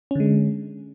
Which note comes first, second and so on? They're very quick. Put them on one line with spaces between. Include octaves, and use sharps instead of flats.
C#4 D3 G#3